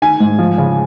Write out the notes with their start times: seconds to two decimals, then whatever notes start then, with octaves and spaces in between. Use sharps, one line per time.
0.02 D#3 G#5
0.20 G#2
0.38 F3
0.58 C#3